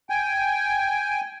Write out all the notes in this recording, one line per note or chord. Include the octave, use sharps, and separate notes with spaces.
G5 G#5